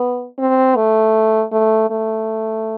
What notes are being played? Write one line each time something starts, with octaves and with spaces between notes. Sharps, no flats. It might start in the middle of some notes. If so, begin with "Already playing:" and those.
Already playing: B3
C4
A3
A3
A3